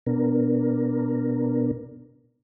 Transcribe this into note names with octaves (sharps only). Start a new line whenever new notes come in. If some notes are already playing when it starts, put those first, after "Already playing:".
B2 B3 D4 A#4